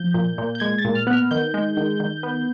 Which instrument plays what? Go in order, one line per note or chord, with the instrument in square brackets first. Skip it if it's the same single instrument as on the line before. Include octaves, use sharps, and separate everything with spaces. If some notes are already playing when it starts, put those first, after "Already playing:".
Already playing: [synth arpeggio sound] F3 G6
A#2
A#2
G6
G#3 G#6
A6
A#2
F6
B3 F#6
F6
D#3 G6
G#3
D#3
D#3
B3